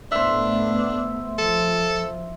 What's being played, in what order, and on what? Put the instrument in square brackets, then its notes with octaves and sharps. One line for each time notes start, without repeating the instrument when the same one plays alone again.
[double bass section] A2 A3 B3 [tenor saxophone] D4 [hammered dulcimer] C5 E5
[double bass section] F3 [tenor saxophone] A4